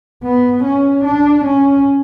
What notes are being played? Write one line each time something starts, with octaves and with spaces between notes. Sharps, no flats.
B3
C#4
D4
C#4